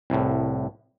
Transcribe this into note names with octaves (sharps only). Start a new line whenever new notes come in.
C2 A2